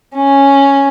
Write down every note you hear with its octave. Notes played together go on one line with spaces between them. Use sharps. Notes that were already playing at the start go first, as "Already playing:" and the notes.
C#4